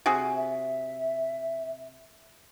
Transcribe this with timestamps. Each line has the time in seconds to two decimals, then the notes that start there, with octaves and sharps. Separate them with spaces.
0.06 C3 F#4 G#4
0.36 E5